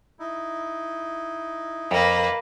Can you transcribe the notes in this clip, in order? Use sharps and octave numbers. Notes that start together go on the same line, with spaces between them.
D#4 E4
F2 A#3 B4